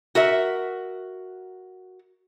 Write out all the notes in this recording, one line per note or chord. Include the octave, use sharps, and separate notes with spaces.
F#4 A#4 E5